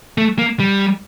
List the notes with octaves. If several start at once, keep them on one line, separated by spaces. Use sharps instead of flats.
A3
A#3
G3